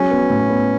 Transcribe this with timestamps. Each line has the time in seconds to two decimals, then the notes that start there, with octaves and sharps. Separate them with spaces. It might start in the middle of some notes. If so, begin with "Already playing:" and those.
Already playing: F#3 G#3 C#4
0.11 B3
0.30 A2
0.50 B3